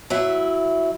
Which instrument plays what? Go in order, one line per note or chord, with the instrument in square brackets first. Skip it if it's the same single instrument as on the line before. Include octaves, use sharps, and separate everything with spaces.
[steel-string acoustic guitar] F#3 E4 E5